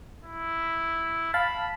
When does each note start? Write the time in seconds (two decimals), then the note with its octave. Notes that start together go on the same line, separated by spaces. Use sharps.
0.25 E4
1.34 F5 A5 B5